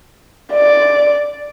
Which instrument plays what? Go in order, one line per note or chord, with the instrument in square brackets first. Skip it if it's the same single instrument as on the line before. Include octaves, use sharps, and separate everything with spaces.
[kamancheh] D5